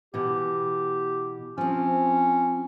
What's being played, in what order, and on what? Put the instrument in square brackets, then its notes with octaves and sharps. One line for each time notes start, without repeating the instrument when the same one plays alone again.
[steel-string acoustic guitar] B2 E3 [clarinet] G4
[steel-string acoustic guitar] F3 C4 [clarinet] C#4